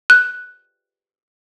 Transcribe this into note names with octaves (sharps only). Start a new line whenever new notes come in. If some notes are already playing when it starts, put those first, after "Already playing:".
F#6